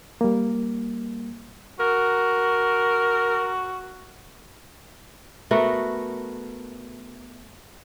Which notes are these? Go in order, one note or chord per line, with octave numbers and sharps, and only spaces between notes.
G3 A#3
F#4 A#4
A3 B3 F#4 A#4